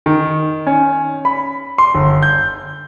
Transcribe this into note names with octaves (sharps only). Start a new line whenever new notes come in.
D#3
C#4
B5
C6
G1
G6